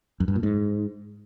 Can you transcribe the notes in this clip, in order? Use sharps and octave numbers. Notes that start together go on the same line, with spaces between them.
F#2
G2
A#2
G#2